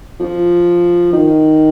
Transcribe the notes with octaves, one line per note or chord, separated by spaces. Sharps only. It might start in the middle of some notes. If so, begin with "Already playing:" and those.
F3
D#3